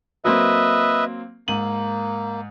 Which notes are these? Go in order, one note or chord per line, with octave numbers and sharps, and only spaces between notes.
F#3 A#3 C4 B4 D#5 E5
G#2 A#3 D#7 F#7